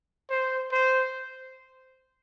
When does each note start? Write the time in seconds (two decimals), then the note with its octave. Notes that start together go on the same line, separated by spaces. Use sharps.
0.30 C5
0.72 C5